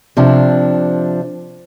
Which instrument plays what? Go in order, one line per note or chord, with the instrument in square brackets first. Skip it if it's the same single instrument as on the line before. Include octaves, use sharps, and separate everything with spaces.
[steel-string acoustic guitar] C3 F3 D4